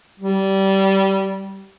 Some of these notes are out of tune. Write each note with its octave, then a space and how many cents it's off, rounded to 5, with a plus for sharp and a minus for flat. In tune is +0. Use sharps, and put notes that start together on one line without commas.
G3 -20